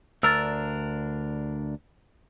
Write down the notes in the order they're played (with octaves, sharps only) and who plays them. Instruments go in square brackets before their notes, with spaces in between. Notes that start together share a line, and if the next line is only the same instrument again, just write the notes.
[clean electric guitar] D2 D4 A#4 [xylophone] E6 F6 A6